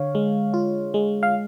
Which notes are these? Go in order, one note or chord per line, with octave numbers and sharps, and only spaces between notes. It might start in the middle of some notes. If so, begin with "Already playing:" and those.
Already playing: D3 C#5 F5
G#3
F4
G#3
F5